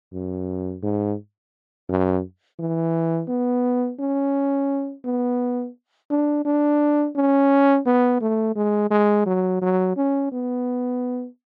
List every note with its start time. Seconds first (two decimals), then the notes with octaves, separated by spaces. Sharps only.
0.13 F#2
0.83 G#2
1.89 F#2
2.59 E3
3.29 B3
3.99 C#4
5.05 B3
6.10 D4
6.45 D4
7.16 C#4
7.86 B3
8.21 A3
8.56 G#3
8.91 G#3
9.26 F#3
9.62 F#3
9.97 C#4
10.32 B3